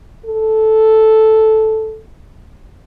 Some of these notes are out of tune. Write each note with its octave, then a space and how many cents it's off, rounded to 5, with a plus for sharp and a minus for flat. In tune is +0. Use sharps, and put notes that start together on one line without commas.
A4 -5